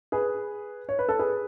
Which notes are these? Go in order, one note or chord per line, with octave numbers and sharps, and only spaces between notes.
G#4 B4
C#5
B4
A4
G#4 B4